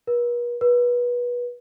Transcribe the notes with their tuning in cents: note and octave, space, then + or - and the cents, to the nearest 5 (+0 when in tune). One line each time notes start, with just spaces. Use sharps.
B4 -45
B4 -25